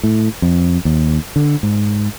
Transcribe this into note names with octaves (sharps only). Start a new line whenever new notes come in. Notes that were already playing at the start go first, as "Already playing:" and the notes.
A2
F2
D#2
D3
G#2